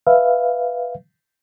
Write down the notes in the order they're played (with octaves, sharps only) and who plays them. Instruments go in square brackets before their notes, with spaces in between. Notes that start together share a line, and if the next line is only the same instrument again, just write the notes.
[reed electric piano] B4 E5 F5